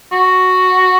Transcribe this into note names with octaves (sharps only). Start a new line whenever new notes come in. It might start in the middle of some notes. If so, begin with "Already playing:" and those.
F#4